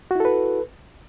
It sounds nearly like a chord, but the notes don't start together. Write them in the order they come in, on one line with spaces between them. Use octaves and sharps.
F#4 E4 A4 B4